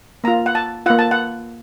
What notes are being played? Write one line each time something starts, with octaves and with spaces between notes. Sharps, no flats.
A#3 F4 A#5
F#5
A5
A#3 F4 F#5
A5
F#5